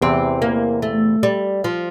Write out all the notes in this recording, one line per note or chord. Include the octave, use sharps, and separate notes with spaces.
E2 C3 E3 C4
A#3
A3
G3
F3